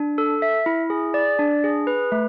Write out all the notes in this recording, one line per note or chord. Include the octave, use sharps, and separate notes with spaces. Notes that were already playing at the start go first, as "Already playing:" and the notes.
Already playing: D4
A4
E5
E4
G#4
D5
D4
G#4
B4
A3